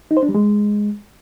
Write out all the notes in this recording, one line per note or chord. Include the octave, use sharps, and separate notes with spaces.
D#4
C5
D4
G3
G#3